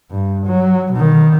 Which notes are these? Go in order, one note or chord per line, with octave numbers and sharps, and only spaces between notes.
G2
F#3
B2 D#3